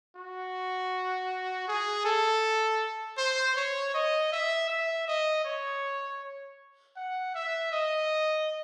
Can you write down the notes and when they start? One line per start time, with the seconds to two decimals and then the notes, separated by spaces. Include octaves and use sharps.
0.16 F#4
1.68 G#4
2.05 A4
3.18 C5
3.55 C#5
3.94 D#5
4.32 E5
4.70 E5
5.07 D#5
5.45 C#5
6.96 F#5
7.35 E5
7.72 D#5